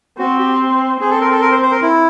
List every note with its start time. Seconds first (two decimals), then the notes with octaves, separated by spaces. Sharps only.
0.18 C4 F#4
0.39 G4
1.00 C4 G#4
1.10 A4
1.20 A#4
1.31 A4
1.41 A#4
1.52 C5
1.62 C5
1.71 A#4
1.82 E4